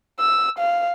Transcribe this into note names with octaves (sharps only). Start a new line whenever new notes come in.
E6
F5